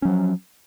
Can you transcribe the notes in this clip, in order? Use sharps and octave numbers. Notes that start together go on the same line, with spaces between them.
F3 F#3 C#4